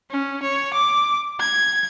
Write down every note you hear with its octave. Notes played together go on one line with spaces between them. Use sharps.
C#4
C#5
D6
G#6